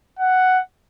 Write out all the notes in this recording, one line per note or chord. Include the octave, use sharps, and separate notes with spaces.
F#5